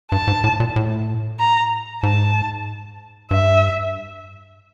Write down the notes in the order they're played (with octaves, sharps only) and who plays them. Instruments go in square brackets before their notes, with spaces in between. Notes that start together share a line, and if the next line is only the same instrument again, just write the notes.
[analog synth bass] G2 [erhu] A5
[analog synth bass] G#2
A2
A#2
A2
[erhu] A#5
[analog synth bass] G#2 [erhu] A5
[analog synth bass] G2 [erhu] E5